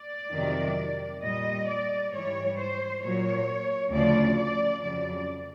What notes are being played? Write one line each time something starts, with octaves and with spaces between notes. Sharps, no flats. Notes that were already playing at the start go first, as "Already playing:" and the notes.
Already playing: D5
F2 C3 D#3 F#3
A#2 G3 D#5
D5
G#2 E3 G3 C#5
C5
A#2 F#3 C#5
D2 C#3 F3 D5
D5
F2 C#3 F#3 D5